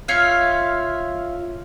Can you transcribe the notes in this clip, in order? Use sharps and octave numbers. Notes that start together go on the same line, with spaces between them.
F4 C#5 E5 F5